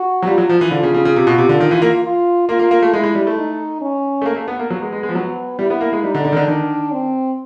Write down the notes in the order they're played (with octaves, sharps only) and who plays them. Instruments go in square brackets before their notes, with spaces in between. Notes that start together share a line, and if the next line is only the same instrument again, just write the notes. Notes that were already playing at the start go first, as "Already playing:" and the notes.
Already playing: [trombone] F#4
[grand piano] F#3
[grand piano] G3 [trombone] F4
[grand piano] F#3
F3
E3
[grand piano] D3 [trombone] F4
[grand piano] C#3
C#3
C#3
C3
B2
C3
D3
D#3
E3
A#3
[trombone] F4
[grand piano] A#3 [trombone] F4
[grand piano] A#3
A#3
A3
[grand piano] G#3 [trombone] E4
[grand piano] G#3
G3
A3
[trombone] D#4
C#4
[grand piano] A3
A#3
A3
B3
A#3
[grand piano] F#3 [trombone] B3
[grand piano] G#3
G#3
G#3
F3
[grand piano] F#3 [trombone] B3
[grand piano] G3 [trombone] E4
[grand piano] B3
A#3
G#3
[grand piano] G3 [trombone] D#4
[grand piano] D3
D3
D#3
D3
[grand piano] D#3 [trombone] D4
[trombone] C4